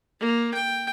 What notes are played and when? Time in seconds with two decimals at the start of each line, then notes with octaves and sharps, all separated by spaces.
0.20 A#3
0.54 G5